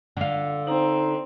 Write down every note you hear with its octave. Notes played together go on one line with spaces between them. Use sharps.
D3 F4
C4 D#4 A#5